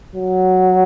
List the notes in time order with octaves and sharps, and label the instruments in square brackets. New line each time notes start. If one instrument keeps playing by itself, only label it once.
[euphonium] F#3